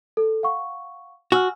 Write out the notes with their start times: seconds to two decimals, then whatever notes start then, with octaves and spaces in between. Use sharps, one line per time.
0.17 A4
0.43 F5 F#5 C#6
1.32 F#4 G#5 E6 F6